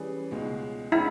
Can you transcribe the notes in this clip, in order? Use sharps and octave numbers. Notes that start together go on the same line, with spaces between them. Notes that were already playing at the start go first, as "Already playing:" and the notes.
Already playing: E3 G3 C#4 G#4 B4
C#2 B2 G#3
G#3 C#4 E4